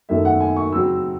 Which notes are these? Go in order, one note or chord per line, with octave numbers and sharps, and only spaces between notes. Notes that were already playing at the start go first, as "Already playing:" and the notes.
F#2 D#3 A3 E5
F#5
G#5
C#6
C#3 F#3 C4 E6